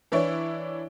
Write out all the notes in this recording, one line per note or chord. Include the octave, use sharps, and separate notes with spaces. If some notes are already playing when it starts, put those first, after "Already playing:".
E3 D4 E4 C#5